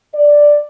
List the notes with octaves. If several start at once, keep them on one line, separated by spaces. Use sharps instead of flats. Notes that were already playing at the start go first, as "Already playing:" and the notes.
D5